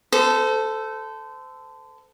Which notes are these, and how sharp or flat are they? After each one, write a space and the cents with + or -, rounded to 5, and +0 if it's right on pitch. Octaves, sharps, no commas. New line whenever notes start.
A4 +0 C5 -30